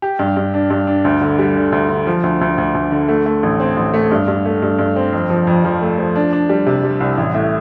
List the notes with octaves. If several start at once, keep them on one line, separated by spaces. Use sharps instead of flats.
G4
G2
G2
D4
G2
D4
D2
D3
G3
D3
D2
D3
F3
D2
D2
D2
D2
D3
A3
A3
A1
C4
A1
A3
G2
G2
A3
G2
G2
C4
F2
F3
F2
F3
A3
F3
D4
D4
G3
C3
G3
C2
A1
A2